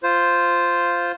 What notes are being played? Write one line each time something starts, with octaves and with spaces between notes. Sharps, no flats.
F4 C5